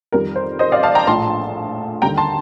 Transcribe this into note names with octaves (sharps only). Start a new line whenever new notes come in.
F2 D#3 G3 A#4
C5
C5 D#5
D5 F5
F5 A5
G5 A#5
A#1 A2 F3 A5 C6
D#2 D3 G3 G5 A#5
A5 C6